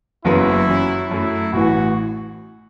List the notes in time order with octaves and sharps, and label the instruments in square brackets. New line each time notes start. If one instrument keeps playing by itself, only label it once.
[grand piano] F#1 F#2 F#3 B3 [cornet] E4
[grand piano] F#2 F#3 C#4
[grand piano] F#2 F#3 A3 [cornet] E4
[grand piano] A1 A2 E3 [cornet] F#4